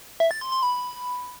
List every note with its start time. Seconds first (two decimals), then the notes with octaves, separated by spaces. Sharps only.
0.20 E5
0.31 A6
0.41 C6
0.52 C6
0.63 B5